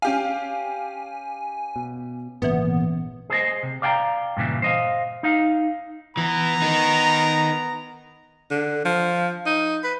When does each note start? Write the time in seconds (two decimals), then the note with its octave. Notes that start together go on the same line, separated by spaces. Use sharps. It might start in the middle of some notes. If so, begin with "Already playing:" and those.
0.02 C#4 G4 F5 G#5
1.76 B2
2.42 G#1 A#2 C#3 E3 B3 B4
3.30 G#4 C5 D5 D#5
3.63 C3
3.82 D5 F5 G5 G#5 A#5
4.37 G2 A#2 C#3 E3
4.62 C5 D#5 F5
5.23 D#4 F5
6.17 E3 B3 A#5
6.62 D#4 A#4
8.51 D3
8.85 F3
9.46 D#4
9.84 B4